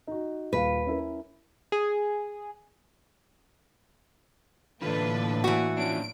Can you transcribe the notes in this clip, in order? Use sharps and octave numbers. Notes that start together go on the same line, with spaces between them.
D#4 F#4
D#1 B4 F5
C#4 E4 A#4
G#4
A2 D3 E3 A#3 D4 F4 A4 B4
E3 F#4
F3 C#4 D4 D7